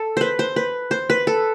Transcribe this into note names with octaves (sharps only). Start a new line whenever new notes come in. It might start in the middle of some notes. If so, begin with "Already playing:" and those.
Already playing: A4
B4 C5
C5
B4
C5
B4
A4